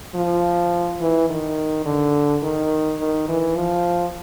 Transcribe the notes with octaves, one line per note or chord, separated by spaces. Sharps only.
F3
E3
D#3
D3
D#3
D#3
E3
F3